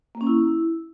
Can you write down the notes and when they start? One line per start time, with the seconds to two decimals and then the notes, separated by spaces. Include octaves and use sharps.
0.15 A#3
0.21 C#4
0.27 E4